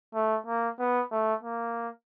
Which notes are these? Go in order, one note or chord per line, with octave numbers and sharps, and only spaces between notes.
A3
A#3
B3
A3
A#3